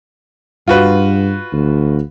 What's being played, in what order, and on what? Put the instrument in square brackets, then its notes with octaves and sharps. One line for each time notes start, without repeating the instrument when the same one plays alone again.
[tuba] G2 [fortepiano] F4 F#4 B4
[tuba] D2